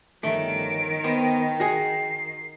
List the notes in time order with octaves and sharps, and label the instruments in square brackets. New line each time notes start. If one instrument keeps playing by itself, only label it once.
[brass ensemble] G1 F3 C#4 [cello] D#3 [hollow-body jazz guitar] A3 [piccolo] D7
[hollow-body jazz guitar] B3 C5 [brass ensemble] D#5 G5
[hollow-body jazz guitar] F#4 G#4 [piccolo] C7